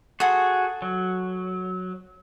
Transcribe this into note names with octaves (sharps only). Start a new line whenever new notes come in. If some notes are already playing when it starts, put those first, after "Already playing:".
F#4 G#4 A4 F#5 C6
F#3